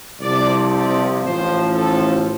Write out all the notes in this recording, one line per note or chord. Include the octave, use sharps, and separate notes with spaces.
C2 C3 F3 D5
D5
A1 A2 F3 C5
A4